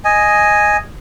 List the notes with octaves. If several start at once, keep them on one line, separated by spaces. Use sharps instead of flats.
D#5 G#5